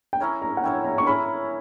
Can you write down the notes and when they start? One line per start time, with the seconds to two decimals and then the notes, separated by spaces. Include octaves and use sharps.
0.13 G5
0.20 C#4 E4 A#4 C#5 A#5
0.42 A#5
0.57 F#5
0.63 C#4 E4 A#4 C#5 G5
0.85 A#5
0.98 C#6
1.07 C#4 E4 A#4 C#5 B5